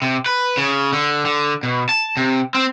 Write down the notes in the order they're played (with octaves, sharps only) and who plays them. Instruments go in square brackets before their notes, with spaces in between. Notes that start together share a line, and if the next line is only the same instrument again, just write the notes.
[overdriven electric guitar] C3
B4
C#3
D3
D3
B2
A5
C3
C4